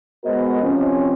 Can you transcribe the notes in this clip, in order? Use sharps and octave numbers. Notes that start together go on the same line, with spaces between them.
G#3 B3 F#4 A#4 C5 D#5
C3 F3 C4 C#4